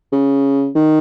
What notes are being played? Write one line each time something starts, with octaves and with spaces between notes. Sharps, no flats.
C#3
D#3